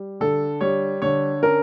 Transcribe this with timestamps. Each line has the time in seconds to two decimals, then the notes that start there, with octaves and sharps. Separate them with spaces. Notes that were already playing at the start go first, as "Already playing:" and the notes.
Already playing: G3
0.20 D3 A4
0.61 G3 C#5
1.02 D3 C#5
1.43 C#4 A#4